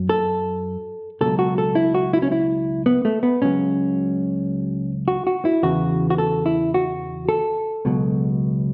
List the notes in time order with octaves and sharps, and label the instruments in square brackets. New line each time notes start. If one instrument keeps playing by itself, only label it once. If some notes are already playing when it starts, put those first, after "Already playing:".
Already playing: [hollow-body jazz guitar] F#2 F#3
A4
C#2 B2 F#3 A4
F#4
A4
E4
F#4
E4
C#4
E4
B3
A3
B3
C#2 C#3 F#3 C#4
F#4
F#4
E4
E2 C#3 E3 F#4
F#4
A4
E4
F#4
A4
C#2 B2 F#3